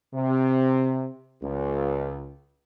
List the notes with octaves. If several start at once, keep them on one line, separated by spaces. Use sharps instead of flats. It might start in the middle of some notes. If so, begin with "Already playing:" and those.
C3
C#2